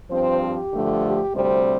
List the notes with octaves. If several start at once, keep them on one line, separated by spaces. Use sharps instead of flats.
G2 F3 C4 C5
G4
G2 D3 F3 A3
G4
D2 C3 G3 C4 C5